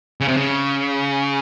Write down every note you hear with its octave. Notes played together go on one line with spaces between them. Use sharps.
C#3
C3
C#3